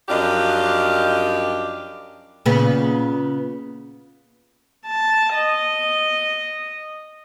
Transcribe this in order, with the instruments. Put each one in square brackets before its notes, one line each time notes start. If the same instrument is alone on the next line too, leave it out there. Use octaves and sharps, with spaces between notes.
[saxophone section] F#2 F3 D4 G4 D#5 F5
[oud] A#2 C#3 B3
[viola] A5
D#5